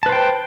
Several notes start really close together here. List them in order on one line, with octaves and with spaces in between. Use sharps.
A5 B4 C5 G5